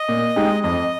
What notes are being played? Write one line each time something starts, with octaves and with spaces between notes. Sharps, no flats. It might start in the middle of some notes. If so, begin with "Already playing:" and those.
Already playing: D#5
A#2
G#3 D#4 G4
F2 D#5